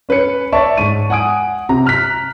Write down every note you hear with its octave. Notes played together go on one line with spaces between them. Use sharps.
C#4 B4 C#5 C#7
C#5 D5 E5 A5 C#6
G#2 C#6 D#7
F#5 G#5 D#6 D7
C3 A#5
A#5 F6 F#6 B6